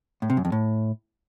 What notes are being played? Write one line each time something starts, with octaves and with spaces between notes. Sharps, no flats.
A2
C3
F#2
F2
A2